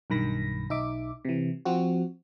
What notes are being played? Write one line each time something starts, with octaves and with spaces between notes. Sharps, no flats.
B1 G2 D#3 B5 A#6
B1 D#4 E5 D6
C3 E3
F3 C4 F#4